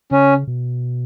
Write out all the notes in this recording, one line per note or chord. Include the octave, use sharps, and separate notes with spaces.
C#3 C#4
B2